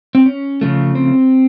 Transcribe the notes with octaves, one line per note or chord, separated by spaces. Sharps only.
C4
C#4
C#3 F3 A3
C4